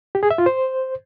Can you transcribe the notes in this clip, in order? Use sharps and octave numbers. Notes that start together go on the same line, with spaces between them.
G4
G#4
E5
F4
C5